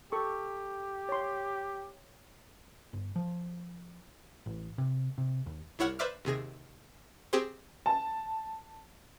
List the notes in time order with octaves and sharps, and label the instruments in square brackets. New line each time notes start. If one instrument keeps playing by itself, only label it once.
[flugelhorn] G4 [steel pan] A4 C#6
[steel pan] C#5 C6
[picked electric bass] G1
F3
A1
C3
C3
D#2
[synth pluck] C2 E4 C#5 F#5 F6
B4 C5 D5 E5 D6 F6
D#2 C3 G#4 A#6
C4 G4 G#4 C5
[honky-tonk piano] A5